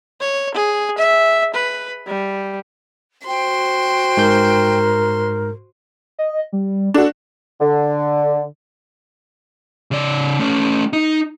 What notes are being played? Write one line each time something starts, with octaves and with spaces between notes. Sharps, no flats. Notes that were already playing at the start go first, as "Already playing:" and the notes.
C#5
G#4
E5
B4
G3
F#4 C5 G5 C6
G#2 A#4 G6
D#5
G3
D4 F#4 A4
D3
C#3 D5
A3 C#4
D#4